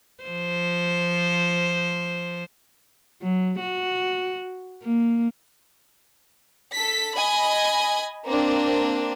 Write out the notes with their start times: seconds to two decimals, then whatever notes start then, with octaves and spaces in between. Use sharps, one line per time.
0.24 F3 C5
3.22 F#3
3.60 F#4
4.83 A#3
6.73 A4 B6
7.15 D#5 G#5 B5
8.27 A#3 C4 D4